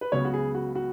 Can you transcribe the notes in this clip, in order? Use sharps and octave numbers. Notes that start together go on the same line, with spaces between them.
B4
C#2 C#3 F#3 B3 C#5
F#4
G#4
F#4
F#4